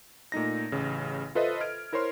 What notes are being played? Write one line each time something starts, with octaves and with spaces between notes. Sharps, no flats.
A#2 A3 D#4 A#6
A1 C#3
F4 A4 B4 C5 D#5 E5
F6 G#6 D7
E4 A#4 C5 C#5 C6